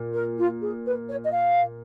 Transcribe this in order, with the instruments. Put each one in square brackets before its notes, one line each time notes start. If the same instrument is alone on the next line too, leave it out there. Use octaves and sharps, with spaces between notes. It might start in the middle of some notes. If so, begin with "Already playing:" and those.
Already playing: [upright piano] A#2
[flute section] A#4
F4
G#4
B4
C#5
D#5
F5